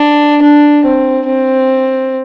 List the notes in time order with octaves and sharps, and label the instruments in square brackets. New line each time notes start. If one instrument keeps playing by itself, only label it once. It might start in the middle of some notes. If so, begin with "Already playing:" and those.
Already playing: [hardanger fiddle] D4
D4
C4
C4